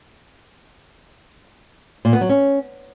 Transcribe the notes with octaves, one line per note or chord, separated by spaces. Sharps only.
A#2
B3
F#3
C#4